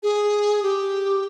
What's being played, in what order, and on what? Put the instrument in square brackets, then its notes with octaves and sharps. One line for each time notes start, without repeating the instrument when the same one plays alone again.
[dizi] G#4
G4